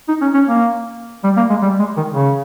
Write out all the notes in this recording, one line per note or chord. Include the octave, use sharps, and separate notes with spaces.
D#4
C#4
C#4
A#3
G3
A#3
G#3
G3
G#3
D#3
C#3